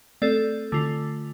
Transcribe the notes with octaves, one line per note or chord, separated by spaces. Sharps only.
A3 C4 A4 D5
D3 A3 F4